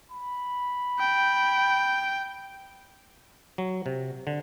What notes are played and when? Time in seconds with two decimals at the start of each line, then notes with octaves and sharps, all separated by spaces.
0.12 B5
1.00 G5
3.58 F#3
3.86 C3
4.27 D3